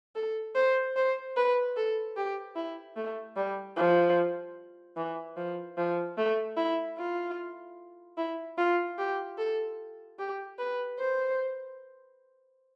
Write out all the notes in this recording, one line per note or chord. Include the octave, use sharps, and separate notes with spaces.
A4
C5
C5
B4
A4
G4
E4
A3
G3
F3
E3
F3
F3
A3
E4
F4
E4
F4
G4
A4
G4
B4
C5